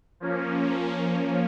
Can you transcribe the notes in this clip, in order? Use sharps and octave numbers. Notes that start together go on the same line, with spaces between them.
F3 A#3 C#4